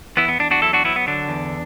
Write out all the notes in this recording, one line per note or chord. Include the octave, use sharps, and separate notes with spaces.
E2 B3 E4
B3
E2 D4
D4 F#4
F#3 E4 A4
D4 F#4
F#3 B3 E4
B3
D3 D4
E2